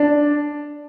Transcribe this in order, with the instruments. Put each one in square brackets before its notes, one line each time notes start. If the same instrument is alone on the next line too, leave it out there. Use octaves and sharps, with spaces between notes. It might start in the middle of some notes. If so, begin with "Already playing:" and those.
Already playing: [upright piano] D4